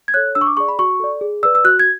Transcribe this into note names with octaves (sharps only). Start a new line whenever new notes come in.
G#6
A4 C#5 F#6
D4 E6
C#6
D6
G#4 D5 C#6
B5
F#4 C#6
A4 D5
G#4
B4 D5 E6
E6
F#4 F#6
G#6